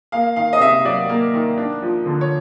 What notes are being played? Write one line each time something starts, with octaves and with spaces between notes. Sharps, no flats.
A#3 F5
D#3 F5
D#5
C3 E5
F#3 D5
A#3
D#3
D4
F3
D3
C#5